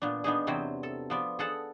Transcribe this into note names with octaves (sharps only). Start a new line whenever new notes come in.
A#2 B3 D4
B3 D4 D#4 G#4
E2 C3 F#3 C4 E4 C5
A4
F3 B3 D5
G#4 A4 F#5 A5